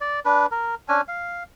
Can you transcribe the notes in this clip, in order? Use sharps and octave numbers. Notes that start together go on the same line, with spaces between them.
D5
D4 B4
A#4
C#4 D4 G#5
F5